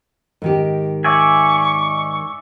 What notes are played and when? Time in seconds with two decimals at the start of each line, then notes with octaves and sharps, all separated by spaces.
0.42 G#2 D#3 G4
1.04 D5 E5 G#5 C#6